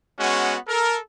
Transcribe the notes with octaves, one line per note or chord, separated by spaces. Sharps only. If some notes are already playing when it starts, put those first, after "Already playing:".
G#3 B3 C#4 F#4
A4 A#4